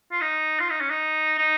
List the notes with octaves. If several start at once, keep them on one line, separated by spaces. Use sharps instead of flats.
F4
D#4
F4
D#4
C#4
D#4
D#4